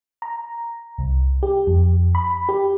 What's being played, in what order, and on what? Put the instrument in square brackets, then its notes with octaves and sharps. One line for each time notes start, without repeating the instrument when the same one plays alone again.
[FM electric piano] A#5
C2
G4
F2
B5
G4